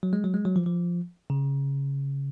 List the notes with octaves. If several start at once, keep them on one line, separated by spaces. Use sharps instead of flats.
F#3
G#3
F#3
G#3
F#3
F3
F3
C#3